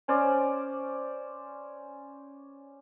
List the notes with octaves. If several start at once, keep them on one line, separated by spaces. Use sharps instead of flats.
C#4 C5 D5